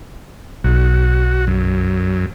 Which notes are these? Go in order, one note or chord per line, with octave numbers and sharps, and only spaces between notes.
B1 F#4
F#2